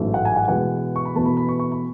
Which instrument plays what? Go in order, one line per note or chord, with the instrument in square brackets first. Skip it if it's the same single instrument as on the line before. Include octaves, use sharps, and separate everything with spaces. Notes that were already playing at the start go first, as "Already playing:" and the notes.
Already playing: [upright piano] A1 G#2 F#3 A3
F#5
G#5
F#5
E2 B2 G#3 F#5
C#6
B5
E2 B2 A3 A5
B5
B5
C#6
C#6
B5